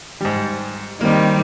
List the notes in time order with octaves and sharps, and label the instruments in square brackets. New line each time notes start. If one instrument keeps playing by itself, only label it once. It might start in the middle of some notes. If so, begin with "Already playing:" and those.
[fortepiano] G#2 G3
[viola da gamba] D#3 G3 [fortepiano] A#3 C4